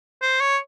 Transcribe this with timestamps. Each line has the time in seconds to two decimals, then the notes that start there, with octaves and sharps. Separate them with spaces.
0.22 C5
0.40 C#5